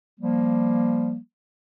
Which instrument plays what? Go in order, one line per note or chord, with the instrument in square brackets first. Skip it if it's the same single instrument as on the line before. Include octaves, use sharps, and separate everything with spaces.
[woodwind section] F3 G3 A#3